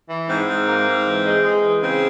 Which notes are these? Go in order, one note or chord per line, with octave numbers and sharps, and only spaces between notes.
E3
G#2 C4
G#2
A#3
G#2
E3
G#3
G#3
E3
C#3 C4